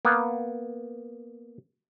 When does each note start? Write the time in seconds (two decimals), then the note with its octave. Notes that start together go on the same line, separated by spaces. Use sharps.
0.05 A#3 B3